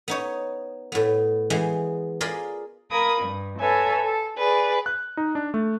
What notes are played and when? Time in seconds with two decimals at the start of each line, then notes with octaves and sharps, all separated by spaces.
0.08 B3 D#4 C#5
0.92 A2 B3
1.50 E3 G#3 B3 C5
2.21 F4 G#4 A#4 D5 F5 B5
2.91 A#4 F5 B5 D#6 G#6
3.21 G2
3.58 A4 B4 C#5 E5 G#5 A#5
4.03 A4
4.38 G#4 B4 D5
4.86 F#6
5.17 D#4
5.35 D4
5.54 A3